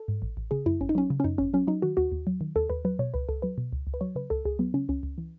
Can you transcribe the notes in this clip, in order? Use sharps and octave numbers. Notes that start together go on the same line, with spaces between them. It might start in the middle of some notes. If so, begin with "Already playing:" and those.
Already playing: A4
G#2
A1
A1
C#3 G#4
F#2 E4
G#1 C#4
D#4
F#3 C#4
C#3
C#4
F#2 D#4
G#1 C#4
F#3 C#4
F#3 D#4
D#3 F#4
D#2 F#4
D#2
F#3
D#3
D#2 A4
D#2 B4
F#3 B4
B2 C#5
C#2 B4
C#2 A4
F#3 B4
B2
C#2
C#2
B4
F#3 C#5
C#3 B4
C#2 A4
C#2 G#4
F#3 B3
C#3 C#4
C#2 C#4
C#2
E3